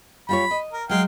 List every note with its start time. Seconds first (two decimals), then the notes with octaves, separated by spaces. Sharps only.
0.29 G3 F4 C#5 B5
0.51 D#5
0.73 A#4
0.89 F#3 G#3 F5 G5